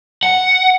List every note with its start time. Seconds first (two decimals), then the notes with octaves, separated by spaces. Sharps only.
0.23 F#5